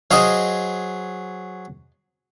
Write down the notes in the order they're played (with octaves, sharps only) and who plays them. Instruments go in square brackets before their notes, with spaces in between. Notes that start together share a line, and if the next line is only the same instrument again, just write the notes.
[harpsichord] F#3 G#4 C5 [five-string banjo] D#5 F5